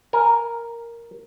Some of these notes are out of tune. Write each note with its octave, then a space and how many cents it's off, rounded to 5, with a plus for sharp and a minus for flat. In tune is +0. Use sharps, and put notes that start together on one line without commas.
A#4 +0 G#5 +0